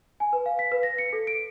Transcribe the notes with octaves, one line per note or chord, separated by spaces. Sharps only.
G#5
B4
F5
B6
B4
A#6
C#7
A4
D7